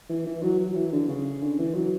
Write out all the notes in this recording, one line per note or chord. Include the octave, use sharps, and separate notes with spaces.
E3
E3
F#3
F#3
E3
D3
C#3
D3
E3
F#3